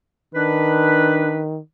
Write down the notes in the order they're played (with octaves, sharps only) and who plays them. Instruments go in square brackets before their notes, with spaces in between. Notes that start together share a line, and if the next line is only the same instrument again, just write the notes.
[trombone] D#3 [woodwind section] D4 B4